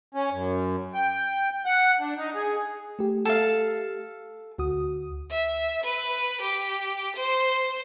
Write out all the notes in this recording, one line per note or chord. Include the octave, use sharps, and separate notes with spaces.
C#4
F#2
G5
F#5
D4
D#4
G#4
A3 G4
A4 F5
D2 F#4 D#6
E5
B4
G4
C5